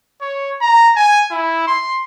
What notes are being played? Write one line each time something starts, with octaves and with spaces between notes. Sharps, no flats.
C#5
A#5
G#5
E4
C6